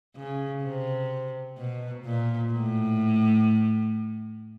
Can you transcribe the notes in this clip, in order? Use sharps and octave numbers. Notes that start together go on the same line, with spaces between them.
C#3
C3
B2
A#2
A2